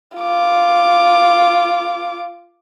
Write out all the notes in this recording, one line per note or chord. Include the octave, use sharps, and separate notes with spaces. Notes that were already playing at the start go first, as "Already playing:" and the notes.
F4 D6